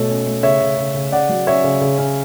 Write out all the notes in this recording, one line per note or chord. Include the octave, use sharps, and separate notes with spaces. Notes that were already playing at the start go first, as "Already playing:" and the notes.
Already playing: B2 A3 A4 C#5
C#4
A3
C#3 C#5 E5
C#3
C#3
C#3
C#3 D5 F#5
F#3
C#4 C#5 E5
C#3
C#3
C#4